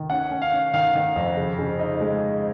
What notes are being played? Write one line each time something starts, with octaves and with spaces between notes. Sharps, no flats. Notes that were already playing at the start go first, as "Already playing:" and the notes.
Already playing: D#3
C#4 F#5
C#4
F5
C#4
D#3 F5
D#3
F2
C#3
C#3
D#4
G#3